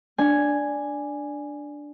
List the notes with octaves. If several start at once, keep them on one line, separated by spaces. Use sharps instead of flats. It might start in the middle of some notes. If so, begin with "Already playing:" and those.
D4 G#5